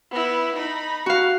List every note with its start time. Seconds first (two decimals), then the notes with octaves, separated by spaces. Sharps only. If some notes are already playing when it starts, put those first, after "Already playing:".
0.11 B3 E4
0.56 D#4 B5
1.06 F#4 F5